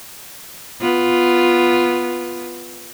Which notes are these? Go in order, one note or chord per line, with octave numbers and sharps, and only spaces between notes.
B3 F4